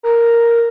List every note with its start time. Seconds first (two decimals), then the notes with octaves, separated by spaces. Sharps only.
0.03 A#4